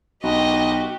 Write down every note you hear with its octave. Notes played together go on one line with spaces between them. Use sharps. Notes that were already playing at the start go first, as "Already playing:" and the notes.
B1 F#4 G4 D#5